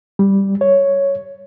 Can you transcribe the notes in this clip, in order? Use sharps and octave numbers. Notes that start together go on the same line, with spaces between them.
G3
C#5